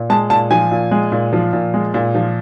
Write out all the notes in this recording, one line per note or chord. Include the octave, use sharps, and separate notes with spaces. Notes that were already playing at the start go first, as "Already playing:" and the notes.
Already playing: A#2
G#3 A5
A#2 A5
F3 G#5
A#2
G#3
A#2
F3
A#2
G#3
A#2
F3